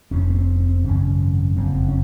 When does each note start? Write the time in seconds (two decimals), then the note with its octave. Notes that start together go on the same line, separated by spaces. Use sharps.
0.11 F1 F2 C3 C#4
0.30 A#3
0.35 C4
0.60 C4
0.84 G#1 F#2 C#3 C#4
1.56 F#1 F2 C3 C4
1.88 C#4